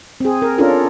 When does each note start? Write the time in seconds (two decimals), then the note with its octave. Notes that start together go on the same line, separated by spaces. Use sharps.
0.20 C4 G#4
0.42 A#4
0.58 C#4 D4 F4 A4 A#4